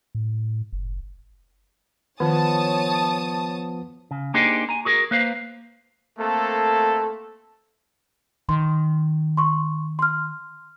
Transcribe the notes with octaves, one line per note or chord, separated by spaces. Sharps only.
A2
F#1
D#3 F3 B3 C#5 A5 D#6
C#3
A#3 D4 D#4 G4 G#4 C5
G#5 A#5
F#4 G#4 A#4
A#3 B4 C5 F5
A3 A#3 C4 A4
D#3 C6
C6 C#6
C6 F6